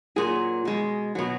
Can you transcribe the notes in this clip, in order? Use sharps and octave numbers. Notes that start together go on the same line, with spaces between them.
A#2 F#3 G#4
B2 G#3
B2 F#3